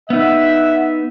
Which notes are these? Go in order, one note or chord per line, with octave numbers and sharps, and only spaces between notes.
B3 D#4 E5 F#5